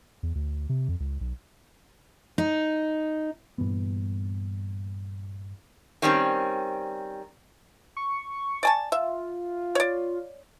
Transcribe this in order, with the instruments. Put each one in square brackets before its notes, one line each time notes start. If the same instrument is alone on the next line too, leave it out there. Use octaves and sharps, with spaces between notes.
[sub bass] E2
D2
C3
F2
C#2
B1
[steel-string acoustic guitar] D#4
[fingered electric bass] G2 A#2 E3 B3
[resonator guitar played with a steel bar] D#3 G3 C4 C#4
[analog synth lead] C#6
[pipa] D5 G#5 A5
[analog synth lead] F4 [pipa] E5
[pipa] C#5 D5